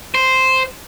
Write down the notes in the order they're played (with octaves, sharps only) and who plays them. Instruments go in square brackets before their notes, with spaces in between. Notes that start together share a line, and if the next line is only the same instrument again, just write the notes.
[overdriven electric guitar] C5